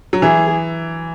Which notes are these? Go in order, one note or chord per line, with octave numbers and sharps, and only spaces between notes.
F#3
E3 G#4